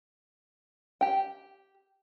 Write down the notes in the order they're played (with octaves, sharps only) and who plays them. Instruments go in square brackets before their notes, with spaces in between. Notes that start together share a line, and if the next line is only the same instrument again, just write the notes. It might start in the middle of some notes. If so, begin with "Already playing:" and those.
[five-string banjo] G4 G5